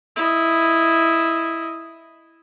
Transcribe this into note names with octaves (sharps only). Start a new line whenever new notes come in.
E4 D#5